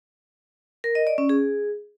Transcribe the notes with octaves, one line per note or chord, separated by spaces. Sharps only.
A#4
D#5
D5
C#4
G#4